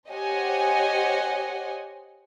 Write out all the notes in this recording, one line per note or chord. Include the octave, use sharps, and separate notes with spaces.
G4 C5 C#5 D#5 F#5 G#5